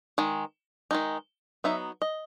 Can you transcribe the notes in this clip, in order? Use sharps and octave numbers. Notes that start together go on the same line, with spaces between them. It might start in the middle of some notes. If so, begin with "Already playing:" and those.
D#3 G#3
D#3 G#3 D#4
F#3 B3 D#4 E5
D#5